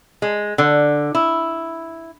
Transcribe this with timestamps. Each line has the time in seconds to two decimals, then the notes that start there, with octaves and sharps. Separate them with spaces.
0.22 G#3
0.58 D3
1.15 E4